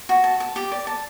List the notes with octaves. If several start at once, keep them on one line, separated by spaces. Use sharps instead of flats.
F#4
A5
A5
G4
D5
A5